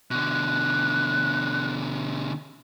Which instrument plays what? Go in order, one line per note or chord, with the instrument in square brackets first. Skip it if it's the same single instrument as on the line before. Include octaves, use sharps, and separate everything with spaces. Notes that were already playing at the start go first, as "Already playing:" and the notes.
[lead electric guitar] B2 D3 [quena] F#6